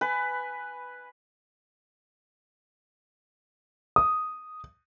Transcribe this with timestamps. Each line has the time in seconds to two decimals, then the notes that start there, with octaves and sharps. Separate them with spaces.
0.01 B4 G#5
3.96 D#6